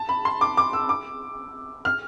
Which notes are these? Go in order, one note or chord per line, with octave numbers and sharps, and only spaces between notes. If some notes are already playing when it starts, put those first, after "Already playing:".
Already playing: A5
B5
C6
D6
D6
E6
D6
F6